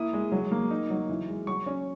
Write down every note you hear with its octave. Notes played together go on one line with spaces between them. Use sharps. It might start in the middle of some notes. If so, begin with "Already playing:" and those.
Already playing: A#3 E4 D#6
G#3
F#3
A#3
D#4
F#3
E3
G#3
F#3 C#6
C#4